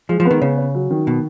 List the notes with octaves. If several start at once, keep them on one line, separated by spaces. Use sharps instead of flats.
F3 G#3
F3
B3
D#3
C#3 C#4
C#4
F#3
D#3
B2